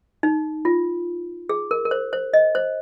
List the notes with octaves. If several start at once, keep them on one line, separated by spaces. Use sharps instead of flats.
D#4
F4
G#4
A#4
A#4
C5
C5
D#5
C5